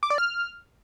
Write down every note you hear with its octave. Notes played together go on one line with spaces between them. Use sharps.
D6
D5
F6